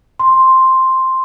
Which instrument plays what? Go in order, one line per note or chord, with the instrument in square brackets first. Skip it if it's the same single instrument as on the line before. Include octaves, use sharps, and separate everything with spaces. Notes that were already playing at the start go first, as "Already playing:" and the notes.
[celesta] C6